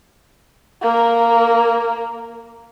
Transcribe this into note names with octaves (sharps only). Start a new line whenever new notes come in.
A#3 A#4